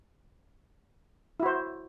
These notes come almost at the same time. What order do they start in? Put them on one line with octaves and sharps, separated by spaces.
E4 F#4 C5